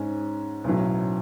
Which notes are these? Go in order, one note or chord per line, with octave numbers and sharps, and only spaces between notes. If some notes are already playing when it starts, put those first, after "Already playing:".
Already playing: G#2 G#3 C#4
B1 A2 F#3 C#4